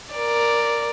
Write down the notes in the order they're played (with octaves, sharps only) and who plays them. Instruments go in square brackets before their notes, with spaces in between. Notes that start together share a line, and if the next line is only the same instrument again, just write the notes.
[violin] A#4 D5